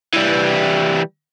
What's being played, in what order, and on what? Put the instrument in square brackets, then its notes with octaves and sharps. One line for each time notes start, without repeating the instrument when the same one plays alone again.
[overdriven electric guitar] E3 G3